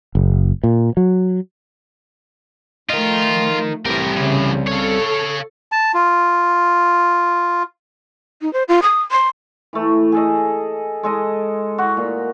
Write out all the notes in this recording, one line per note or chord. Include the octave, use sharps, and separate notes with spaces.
F#1
A#2
F#3
F3 A3 D#4 F4 A#4
C2 A2 E3 G4 A#4
A2 C#3 E3
A4 C#5 F5
A5
F4
D#4
C5
F4
D#6
C6
E3 A3
G#4 A4 D#5
G#3 A4 D#5
F#4
A#2